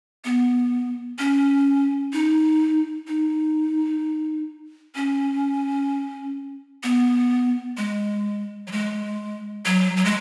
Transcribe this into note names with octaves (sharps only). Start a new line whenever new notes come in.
B3
C#4
D#4
D#4
C#4
B3
G#3
F#3
G#3
F#3
F#3
G#3